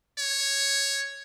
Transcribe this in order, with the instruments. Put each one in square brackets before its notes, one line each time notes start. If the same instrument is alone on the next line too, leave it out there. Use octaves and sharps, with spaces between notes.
[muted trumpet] C#5